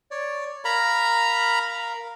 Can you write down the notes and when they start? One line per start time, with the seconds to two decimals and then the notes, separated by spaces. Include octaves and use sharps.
0.11 C#5 D5
0.65 A#4 F5 A#5 B5